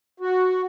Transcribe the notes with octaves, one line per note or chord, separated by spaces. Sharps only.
F#4